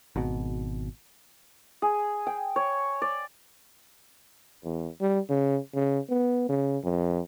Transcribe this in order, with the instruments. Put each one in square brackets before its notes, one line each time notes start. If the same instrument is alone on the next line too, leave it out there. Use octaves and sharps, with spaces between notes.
[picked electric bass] G#1 B2
[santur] G#4
G5
C#5
D5
[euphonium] E2
G3
C#3
C#3
B3
C#3
F2